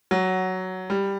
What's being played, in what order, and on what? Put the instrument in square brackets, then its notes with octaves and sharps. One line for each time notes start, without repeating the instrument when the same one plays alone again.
[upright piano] F#3
G3